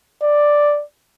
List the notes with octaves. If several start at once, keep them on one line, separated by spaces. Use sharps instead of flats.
D5